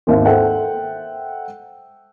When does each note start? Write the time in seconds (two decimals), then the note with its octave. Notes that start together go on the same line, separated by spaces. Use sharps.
0.07 G#1 D#2 E5
0.25 A4 C5 E5 F#5 G5